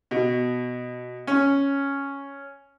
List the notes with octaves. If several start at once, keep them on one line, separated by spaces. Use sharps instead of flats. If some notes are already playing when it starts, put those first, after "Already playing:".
B2
C#4